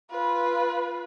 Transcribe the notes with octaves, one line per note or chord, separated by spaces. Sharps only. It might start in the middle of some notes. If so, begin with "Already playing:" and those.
F4 B4